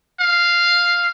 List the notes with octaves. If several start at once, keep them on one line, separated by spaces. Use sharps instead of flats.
F5